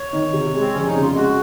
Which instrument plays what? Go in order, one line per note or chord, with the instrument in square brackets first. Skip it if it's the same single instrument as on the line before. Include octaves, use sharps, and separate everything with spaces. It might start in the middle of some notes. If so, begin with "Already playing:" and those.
Already playing: [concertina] C#5
[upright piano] D#3
C3
G#3
[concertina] C4
[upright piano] F1 [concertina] C#4
[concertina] D#4
[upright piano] C#3
[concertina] F4
[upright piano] G#3 [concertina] F#4